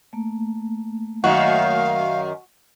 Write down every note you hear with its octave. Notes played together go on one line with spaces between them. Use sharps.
A3 A#3
F#2 D#3 F#4 F5